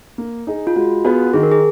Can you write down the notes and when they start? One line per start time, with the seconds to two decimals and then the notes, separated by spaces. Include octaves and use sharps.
0.18 A#3
0.47 D#4 G#4
0.67 F4
0.76 G#3 F#4
1.05 B3 F4 F#4 G#4 B4
1.33 D#3 G#4
1.43 A#4
1.51 G#4